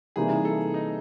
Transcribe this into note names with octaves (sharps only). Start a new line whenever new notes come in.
C3 E3 G3 A#3 D#4 G#4
A4
D#4